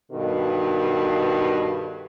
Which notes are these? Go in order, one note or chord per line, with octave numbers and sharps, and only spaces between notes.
G2 B2 D#3 A4